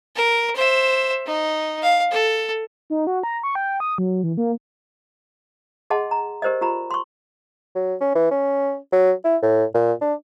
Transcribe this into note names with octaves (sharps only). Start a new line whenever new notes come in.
A#4
C5 E5
D#4
F5
A4
D#4
F#4
A#5
C#6
G5
D#6
F#3
E3
A#3
G#4 D#5 F#5 A5 C6
A#5
G4 A#4 C5 D5 D#5
F4 G4 A#5 B5
C6 C#6
F#3
C#4
E3
C#4
F#3
E4
A2
A#2
D4